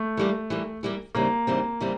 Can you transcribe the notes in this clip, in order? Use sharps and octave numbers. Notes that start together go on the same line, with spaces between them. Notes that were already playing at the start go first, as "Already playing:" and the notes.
Already playing: A3
E3 G3 A#3
E3 G3 A#3
E3 G3 A#3
D#2 C#3 E3 G3 A#3 C4
D#2 C#3 E3 G3 C4
C#3 E3 G3 C4